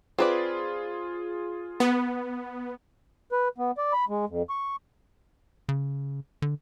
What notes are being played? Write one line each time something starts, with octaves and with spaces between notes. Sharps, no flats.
C4 F4 G#4 B4 D5
B3
B4
B3
D5
B5
G#3
F2
C#6
C#3
D3